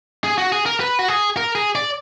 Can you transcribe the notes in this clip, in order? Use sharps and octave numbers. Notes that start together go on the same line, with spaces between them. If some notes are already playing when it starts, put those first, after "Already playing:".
G#4
F#4
G#4
A#4
B4
F#4
G#4
A#4
G#4
D5